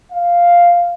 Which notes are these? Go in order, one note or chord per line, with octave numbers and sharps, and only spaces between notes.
F5